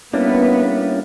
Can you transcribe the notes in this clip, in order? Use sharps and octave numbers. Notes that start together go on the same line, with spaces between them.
G3 A#3 B3 C#4 D4 E4